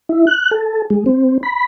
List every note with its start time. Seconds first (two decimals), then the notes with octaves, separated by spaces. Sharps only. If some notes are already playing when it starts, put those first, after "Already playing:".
0.09 E4
0.27 F#6
0.51 A4
0.90 G#3
1.06 C4
1.43 B5